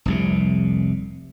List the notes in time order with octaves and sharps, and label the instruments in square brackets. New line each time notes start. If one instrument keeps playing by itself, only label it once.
[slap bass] F1 C2 C3